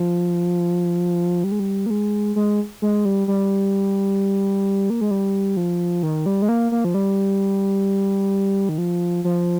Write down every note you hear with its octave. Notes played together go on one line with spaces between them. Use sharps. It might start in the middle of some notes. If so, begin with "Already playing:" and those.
Already playing: F3
G3
G#3
G3
A#3
G#3
G#3
G#3
G3
G3
A#3
G#3
G3
F3
D#3
G3
G#3
A#3
A#3
F3
G3
D#3
F3
F3